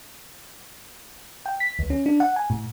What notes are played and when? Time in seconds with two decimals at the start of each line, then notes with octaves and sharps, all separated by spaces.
1.46 G5
1.60 B6
1.79 D2
1.90 C#4
2.06 D4
2.20 F#5
2.36 G#5
2.50 A2